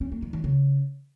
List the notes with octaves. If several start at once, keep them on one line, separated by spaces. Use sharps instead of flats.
C#4
A#3
D#3
D#3
C#3